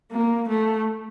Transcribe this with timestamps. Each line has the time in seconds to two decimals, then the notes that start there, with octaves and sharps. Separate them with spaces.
0.11 A#3
0.48 A3